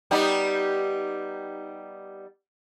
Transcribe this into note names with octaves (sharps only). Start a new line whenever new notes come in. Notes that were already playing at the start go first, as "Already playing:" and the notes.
G3 B3 D#4